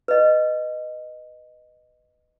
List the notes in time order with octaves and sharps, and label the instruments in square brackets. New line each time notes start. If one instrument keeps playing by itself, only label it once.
[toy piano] B4 D#5